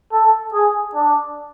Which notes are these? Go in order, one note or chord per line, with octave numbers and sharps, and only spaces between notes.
A4
G#4
D4